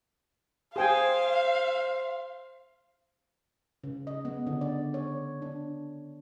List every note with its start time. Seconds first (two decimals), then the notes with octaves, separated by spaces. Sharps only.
0.76 G#4 C5 F5 G5 G#5
3.84 C#3
4.07 D#5
4.25 B3
4.47 D3
4.61 D5
4.94 C#5
5.42 D4